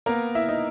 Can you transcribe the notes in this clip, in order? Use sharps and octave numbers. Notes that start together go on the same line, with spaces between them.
A#3 B3 A#4
E4 E5
D#4